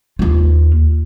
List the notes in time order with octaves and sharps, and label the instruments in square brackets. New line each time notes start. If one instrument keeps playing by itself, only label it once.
[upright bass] D#2 F4